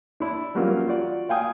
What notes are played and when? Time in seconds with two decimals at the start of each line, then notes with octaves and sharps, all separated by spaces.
0.20 D4 E4
0.55 E3 F#3 G3 A#3 C#4 F4
0.87 F4 F#4 D5
1.29 F5 G5 G#5 D#6